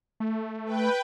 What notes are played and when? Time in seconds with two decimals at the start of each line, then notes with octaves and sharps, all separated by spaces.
0.20 A3
0.65 B4 G5